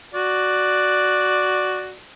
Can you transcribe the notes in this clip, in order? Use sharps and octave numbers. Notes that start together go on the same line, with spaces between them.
F#4 D5